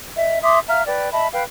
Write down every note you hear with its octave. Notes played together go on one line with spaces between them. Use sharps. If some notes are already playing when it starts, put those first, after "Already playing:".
D#5 E5
E5 C6 D6 D#6
E5 F5 A#5 F6
B4 D5 G5
D#5 E5 A5 B5
B4 F5 G5